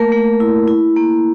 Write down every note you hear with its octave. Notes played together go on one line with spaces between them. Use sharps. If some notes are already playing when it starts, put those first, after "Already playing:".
Already playing: A3 A#3 A#4
A3
E4
E4
A#3